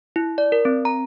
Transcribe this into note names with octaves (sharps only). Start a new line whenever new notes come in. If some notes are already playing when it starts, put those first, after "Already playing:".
E4
D5
A#4
C4
A#5